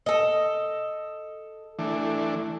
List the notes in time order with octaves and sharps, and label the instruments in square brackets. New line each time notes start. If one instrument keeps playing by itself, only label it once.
[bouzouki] A4 D#5
[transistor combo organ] E3 A3 D4